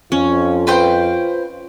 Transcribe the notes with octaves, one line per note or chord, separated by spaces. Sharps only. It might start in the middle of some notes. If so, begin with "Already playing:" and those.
F2 C#4 F4
B4 C5 G5